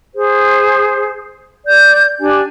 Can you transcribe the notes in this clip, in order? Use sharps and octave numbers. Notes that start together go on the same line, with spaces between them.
G#4 C5
D5 G6
D4 G4 G#5